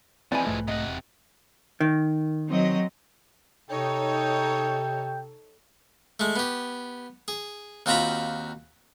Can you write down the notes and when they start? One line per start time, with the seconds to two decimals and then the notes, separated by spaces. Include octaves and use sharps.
0.32 E3 F3 G#3 C4 D5 G#5 B5
0.47 B1 G#2 A3
0.68 C3 D#5 F#5
0.85 E1
1.80 D#3
2.47 F#3 C4 D#5
3.70 C3 D#4 A4 C#5 G5
6.20 G#3 A3
6.36 B3 G4
7.28 G#4
7.86 D#2 C4 F4 F#4 A#5 B5